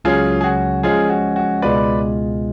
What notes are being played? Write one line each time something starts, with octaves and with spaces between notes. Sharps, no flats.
C#2 C#3 F#3 C#4 F4 G#4
G#4
F#4
F3 G#3 C#4 F4 G#4
F#4
F#4
C#2 B2 G#3 B3 F4 B4 D5